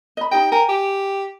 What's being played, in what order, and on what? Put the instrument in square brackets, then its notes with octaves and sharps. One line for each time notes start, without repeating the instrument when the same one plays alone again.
[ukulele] D#5 B5
[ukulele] D#4 G4 D#5 [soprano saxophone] G5
[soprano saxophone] A#4 [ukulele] G5 G#5
[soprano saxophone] G4